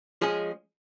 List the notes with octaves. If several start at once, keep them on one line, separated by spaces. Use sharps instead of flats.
F3 G#3 C#4 G#4